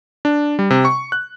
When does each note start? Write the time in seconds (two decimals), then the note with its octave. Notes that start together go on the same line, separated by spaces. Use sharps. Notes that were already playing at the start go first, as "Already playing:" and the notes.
0.25 D4
0.59 G3
0.70 C3
0.85 C#6
1.12 F#6